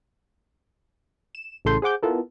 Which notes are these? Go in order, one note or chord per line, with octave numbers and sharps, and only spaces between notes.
E7
A1 A2 C#3 A4 C6 G6
G#4 C5 F#5 D6 G6
B3 E4 F4 A4 A#4